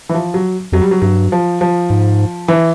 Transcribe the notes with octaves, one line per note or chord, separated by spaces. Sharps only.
E3
F3
F#3
F2 F#3
G3
F#3
G2 F#3
F3
F3
G#2
E3